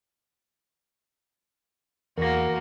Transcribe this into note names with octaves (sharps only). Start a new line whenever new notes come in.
E2 A#3 F#4 A#4 A#6